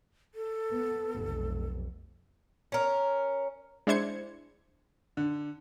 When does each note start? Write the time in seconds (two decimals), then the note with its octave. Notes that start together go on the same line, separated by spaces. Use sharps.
0.35 A4
0.72 B3
1.15 F1 B1
2.72 C#4 A#4
3.87 G#3 D4 E4 C5 G#6 C#7
5.17 D3